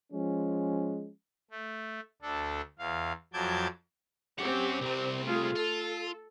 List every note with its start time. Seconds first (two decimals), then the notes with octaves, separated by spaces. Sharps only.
0.13 F3 G#3 C#4
1.51 A3
2.22 D2 D4 A4
2.79 E2 F5
3.33 F2 F#3 A5 D6 G6 G#6
4.39 C4 C#4 G4 F#5
4.81 C2 C3 C4
5.26 A3 F4 G#4
5.56 F4 A4